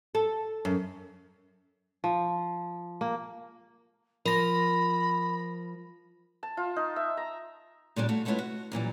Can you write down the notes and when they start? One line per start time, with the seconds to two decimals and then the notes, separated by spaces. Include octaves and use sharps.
0.15 A4
0.65 F#2
2.04 F3
3.01 A#3
4.26 F3 A#4 B5 A#6
6.43 A5
6.57 F4
6.76 D#4
6.96 E5
7.17 A#5
7.96 A#2 C#3 G3 D4
8.09 A3 F#4 F5
8.25 G#3 A3 B3 C#4 E4 F4
8.39 F#4
8.72 F#2 A#2 E3 G3